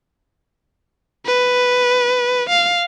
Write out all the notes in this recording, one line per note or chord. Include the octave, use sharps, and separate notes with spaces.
B4
F5